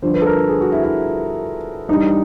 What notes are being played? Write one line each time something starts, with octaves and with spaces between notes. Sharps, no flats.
G2 D3 F3 C5
B4
A4
A#4
G#4
F#4
E4
E4
G2 E3 G3 D#4